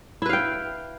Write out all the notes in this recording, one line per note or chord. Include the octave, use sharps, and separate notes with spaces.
E4 B4 F5 G5